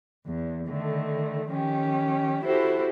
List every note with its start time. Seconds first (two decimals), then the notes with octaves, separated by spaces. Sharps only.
0.25 E2
0.67 D3 D#3 A3
1.49 D#3 F3 C#4 G4
2.43 E4 F#4 G4 A4 C5